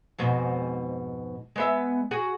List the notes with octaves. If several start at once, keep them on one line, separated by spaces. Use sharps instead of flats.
F2 G#2 B2
G#3 B3 E5
F#4 G#4